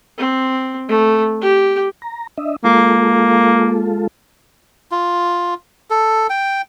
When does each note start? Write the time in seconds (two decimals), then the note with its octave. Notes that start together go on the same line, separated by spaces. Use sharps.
0.18 C4
0.88 A3
1.41 G4
2.02 A#5
2.38 D4 D#5 E5
2.64 G#3 A#3 F4 A4
4.91 F4
5.90 A4
6.30 G5